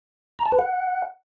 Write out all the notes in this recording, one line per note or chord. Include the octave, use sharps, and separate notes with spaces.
A#5
A5
B4
F#5